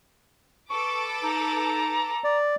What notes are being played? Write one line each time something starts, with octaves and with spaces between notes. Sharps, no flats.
A4 B4 C#6 D6
D#4 A#5
D5